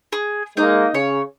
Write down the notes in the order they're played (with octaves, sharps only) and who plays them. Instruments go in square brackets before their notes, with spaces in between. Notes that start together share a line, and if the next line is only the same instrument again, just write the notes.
[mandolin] G#4
[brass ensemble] G#3 A#3 [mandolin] D#4 D#5
[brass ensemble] C#3 [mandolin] C#5